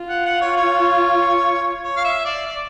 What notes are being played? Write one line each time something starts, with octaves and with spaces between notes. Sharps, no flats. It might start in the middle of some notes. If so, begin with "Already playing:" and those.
Already playing: F4
F#5
F#5
C#5
C#5
C#5
F5
E5
D5
D5